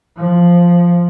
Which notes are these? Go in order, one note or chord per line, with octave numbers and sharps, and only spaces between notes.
F3